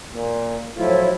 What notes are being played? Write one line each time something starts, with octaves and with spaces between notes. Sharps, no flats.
A#2
A2 F3 F#3 E4 F4